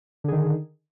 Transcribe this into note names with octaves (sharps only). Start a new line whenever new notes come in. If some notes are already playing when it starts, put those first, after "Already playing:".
D3 D#3 G#4